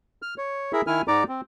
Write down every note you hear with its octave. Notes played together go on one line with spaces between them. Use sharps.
F6
C#5
E4 G#4 A#4 E5
D#3 E4 G#5 F6
G#2 G#3 D#4 D5 A#5 D6
C4